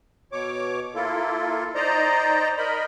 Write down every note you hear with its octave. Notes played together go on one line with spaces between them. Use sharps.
B2 C#5 D6
A#3 E4 F4 A4
D#4 C5 D5 D#5 A#5
A#4 D#5 B5